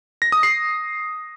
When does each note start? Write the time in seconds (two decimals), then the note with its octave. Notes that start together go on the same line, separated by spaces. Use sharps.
0.22 A#6
0.32 D#6
0.43 C7